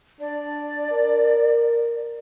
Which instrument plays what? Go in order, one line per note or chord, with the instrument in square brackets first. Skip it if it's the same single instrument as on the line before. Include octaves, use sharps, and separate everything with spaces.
[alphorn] D4 [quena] D5
[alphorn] A#4